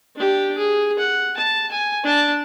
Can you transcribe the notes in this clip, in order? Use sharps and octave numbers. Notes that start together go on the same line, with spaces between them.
D4 G4
G#4
F#5
A5
G#5
D4 A5